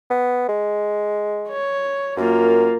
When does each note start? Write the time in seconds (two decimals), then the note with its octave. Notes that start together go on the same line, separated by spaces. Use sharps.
0.10 B3
0.48 G#3
1.49 C#5
2.17 F#2 A#3 F4